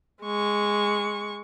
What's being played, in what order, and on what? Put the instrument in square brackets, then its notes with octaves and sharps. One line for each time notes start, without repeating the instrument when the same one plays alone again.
[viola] G#3 C#6